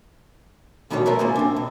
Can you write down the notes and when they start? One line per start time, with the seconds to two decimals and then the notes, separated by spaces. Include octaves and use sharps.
0.90 B1 B2 D#3 F3 G3 C#5
1.06 F4 A#4 B4 C#5 E5
1.19 G#2 C#3 F3 A#3 C4
1.36 C4 D4
1.56 B2